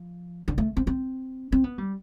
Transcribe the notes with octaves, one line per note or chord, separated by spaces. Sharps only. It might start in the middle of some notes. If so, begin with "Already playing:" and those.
Already playing: F3
D3
A3
C4
C4
C4
B3
G3